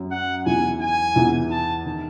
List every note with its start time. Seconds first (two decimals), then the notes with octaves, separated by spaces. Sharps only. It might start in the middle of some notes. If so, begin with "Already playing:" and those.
Already playing: F#2 F#3
0.11 F#5
0.46 E2 E3 G#5
0.81 G#5
1.16 E2 E3
1.51 A5
1.85 D#3